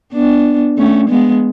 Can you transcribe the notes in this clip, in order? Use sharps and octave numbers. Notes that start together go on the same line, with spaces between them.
B3 D4
A3 C#4
G#3 B3